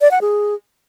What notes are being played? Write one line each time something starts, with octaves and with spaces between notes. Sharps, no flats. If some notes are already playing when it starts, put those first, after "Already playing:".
D5
F#5
G#4